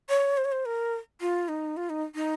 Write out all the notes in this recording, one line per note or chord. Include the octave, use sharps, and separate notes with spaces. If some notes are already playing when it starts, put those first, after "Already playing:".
C#5
C5
C#5
C5
A#4
F4
D#4
F4
D#4
D#4